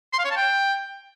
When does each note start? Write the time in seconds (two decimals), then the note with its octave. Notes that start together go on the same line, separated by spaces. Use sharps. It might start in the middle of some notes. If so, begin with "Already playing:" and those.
0.13 C6
0.19 F5
0.25 C#5
0.31 A5
0.37 G5